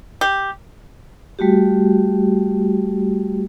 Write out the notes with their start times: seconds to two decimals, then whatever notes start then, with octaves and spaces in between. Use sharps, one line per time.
0.21 G4
1.39 G3 A3 F#4 G4